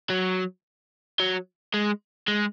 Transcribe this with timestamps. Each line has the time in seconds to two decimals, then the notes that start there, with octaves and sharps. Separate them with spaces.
0.10 F#3
1.20 F#3
1.74 G#3
2.28 G#3